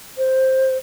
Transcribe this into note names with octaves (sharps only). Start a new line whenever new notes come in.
C5